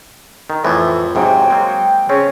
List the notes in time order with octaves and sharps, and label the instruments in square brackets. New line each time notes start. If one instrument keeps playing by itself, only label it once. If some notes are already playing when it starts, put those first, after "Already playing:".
[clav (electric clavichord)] D#3
[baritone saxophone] F2 [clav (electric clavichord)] A2 E3
[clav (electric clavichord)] F2 G#2 C3 [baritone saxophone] F#3 [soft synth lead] G5
[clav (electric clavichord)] G#3 A#3 C4
[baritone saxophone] C#3 [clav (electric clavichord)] C4 C#4 [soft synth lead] C#5